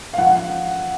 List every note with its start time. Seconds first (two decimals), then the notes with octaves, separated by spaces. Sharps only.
0.14 F5
0.18 F3 F#5